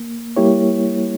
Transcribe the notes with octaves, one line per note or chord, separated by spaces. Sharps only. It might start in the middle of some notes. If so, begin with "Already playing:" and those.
Already playing: A#3
G3 A#3 E4 G4 C#5